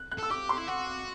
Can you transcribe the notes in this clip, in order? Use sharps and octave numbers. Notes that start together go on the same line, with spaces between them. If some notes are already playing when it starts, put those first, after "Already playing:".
Already playing: F#6
F#6
A4 E6
G4 D6
C6
E4
F#4 F#5